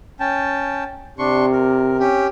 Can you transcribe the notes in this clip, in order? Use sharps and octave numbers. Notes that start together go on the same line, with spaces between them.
C#4 G5 A5
C3 D4 C6 C#6
A#4
C#4 G4